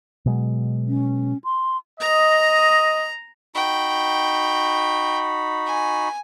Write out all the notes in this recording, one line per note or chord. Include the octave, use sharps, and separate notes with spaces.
B2 F#3 G#3
C#4
C6
D#5 A#5
D#4 F#4 G5 B5
G#5